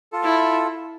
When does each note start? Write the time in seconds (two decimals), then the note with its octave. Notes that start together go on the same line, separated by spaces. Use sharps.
0.12 F4 A4
0.24 E4